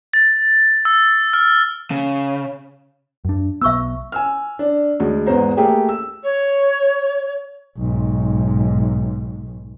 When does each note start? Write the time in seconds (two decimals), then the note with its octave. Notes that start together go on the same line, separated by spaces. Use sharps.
0.14 A6
0.85 E6
1.33 F6
1.91 C#3
3.25 F#2 D4
3.62 B1 B3 E5 C#6 E6
4.12 G#5 E6 F6
4.59 D4
5.00 D2 G#3
5.26 E2 G#2 B3 C5 A#5
5.57 A3 A#3 G4 G#4 G5
5.89 E6
6.23 C#5
7.77 B1 G#2